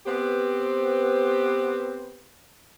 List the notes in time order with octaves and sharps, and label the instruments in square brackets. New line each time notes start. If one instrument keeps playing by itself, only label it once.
[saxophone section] B3 C4 G4 B4 C5